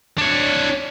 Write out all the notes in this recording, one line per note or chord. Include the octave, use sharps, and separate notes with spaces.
D4 C#5